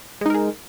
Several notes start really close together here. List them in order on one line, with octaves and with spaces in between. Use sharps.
G#3 D#4 A#4 G#4